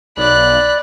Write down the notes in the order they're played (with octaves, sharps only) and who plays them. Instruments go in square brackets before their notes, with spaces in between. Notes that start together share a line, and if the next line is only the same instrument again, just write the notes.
[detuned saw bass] B1 [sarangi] D5 [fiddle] B5 F#6